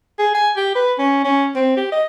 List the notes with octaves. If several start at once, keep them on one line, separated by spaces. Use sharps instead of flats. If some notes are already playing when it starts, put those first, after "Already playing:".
G#4
G#5
G4
B4
C#4
C#4
C4
G4
D#5